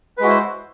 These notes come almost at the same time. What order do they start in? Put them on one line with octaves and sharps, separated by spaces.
B4 G#3 F#4 E4 C5